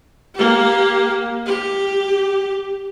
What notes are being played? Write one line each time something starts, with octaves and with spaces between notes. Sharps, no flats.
A#3 G4
G4